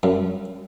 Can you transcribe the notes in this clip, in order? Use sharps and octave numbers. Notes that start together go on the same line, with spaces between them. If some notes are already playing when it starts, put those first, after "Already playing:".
F#2